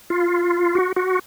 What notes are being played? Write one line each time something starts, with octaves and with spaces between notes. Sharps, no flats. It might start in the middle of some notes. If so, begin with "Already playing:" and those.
F4
F#4
F#4